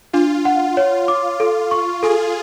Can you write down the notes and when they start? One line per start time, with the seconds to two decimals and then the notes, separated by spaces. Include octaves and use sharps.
0.13 D4 F4
0.45 F#5
0.77 C#5
1.08 D6
1.40 A4
1.71 C#6
2.03 G#4 A4